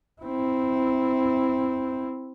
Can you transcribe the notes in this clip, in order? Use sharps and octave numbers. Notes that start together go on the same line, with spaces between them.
C4 E4